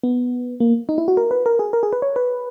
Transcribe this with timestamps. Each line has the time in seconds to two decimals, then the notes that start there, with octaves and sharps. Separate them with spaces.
0.03 B3
0.60 A#3
0.89 D#4
0.98 E4
1.08 F#4
1.17 A#4
1.31 B4
1.46 A#4
1.59 G#4
1.73 A#4
1.83 G#4
1.93 B4
2.02 C#5
2.16 B4